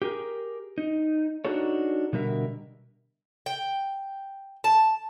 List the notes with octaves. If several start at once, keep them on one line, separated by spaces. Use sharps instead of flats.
G4 G#4 A#4
D#4
D4 D#4 F#4 G#4 A4 C#5
B2 D3 G3 A#4 E5
G5
A5